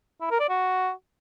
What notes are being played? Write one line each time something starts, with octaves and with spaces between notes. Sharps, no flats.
E4
A#4
D5
F#4